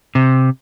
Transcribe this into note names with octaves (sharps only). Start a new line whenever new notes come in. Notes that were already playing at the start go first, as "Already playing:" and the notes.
C3